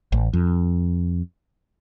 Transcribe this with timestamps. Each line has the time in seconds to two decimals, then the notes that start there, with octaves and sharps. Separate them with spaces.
0.12 A1
0.33 F2